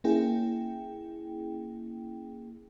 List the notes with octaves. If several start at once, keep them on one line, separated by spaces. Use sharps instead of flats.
A#3 C#4 E4 G#4 G5